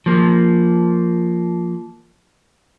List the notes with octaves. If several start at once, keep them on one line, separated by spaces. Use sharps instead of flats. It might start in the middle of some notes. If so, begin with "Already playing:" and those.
F3 A#3